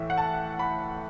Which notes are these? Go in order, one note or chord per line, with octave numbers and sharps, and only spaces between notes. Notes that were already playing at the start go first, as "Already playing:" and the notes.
Already playing: A2 E3 E5
F#5
A5
B5